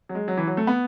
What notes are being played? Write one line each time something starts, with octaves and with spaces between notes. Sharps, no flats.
F#3
G#3
F#3
E3
F#3
A3
B3